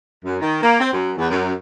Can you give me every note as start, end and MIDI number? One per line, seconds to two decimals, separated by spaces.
0.25 0.36 42
0.41 0.62 51
0.62 0.80 58
0.80 0.91 60
0.92 1.11 42
1.18 1.28 40
1.31 1.53 42